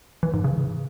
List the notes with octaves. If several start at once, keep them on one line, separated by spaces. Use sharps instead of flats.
E3
G#2
C#3